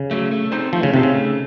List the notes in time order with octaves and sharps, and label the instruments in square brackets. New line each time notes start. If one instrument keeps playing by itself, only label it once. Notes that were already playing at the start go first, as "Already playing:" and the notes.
Already playing: [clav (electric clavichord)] C#3
[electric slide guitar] F#3 A3
A3
C4 D#4 A4 C5
[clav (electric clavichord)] F3 [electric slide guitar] A3
[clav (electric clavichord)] C#3
[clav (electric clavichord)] C3 [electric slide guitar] C4 D#4 A4 C5
[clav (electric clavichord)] C#3
[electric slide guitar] A3